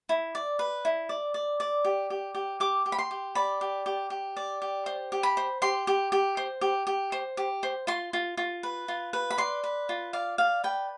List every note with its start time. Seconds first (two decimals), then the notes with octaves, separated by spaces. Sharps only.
0.09 E4
0.35 D5
0.59 B4
0.85 E4
1.09 D5
1.34 D5
1.60 D5
1.85 G4
2.10 G4
2.35 G4
2.60 G4 D6
2.86 G4
2.92 B5
2.98 C6
3.11 G4
3.35 D5 B5
3.61 G4
3.86 G4
4.10 G4
4.37 D5
4.62 G4
4.86 C5
5.12 G4
5.23 B5
5.37 C5
5.62 G4 C6
5.87 G4
6.12 G4
6.37 C5
6.61 G4
6.87 G4
7.12 C5
7.37 G4
7.63 C5
7.87 F4 C6
8.13 F4
8.37 F4
8.63 B4
8.88 F4
9.13 B4
9.31 B5
9.38 D5 C6
9.64 B4
9.89 F4
10.13 D5 F5
10.38 D5 F5
10.64 B4 G5